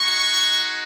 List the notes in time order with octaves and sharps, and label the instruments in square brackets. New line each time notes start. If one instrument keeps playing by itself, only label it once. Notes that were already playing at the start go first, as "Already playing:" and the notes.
Already playing: [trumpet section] G#3 D#4 F#4 C#6